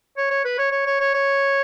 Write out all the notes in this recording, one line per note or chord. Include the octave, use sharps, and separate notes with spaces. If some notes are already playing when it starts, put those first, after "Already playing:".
C#5
C#5
B4
C#5
C#5
C#5
C#5
C#5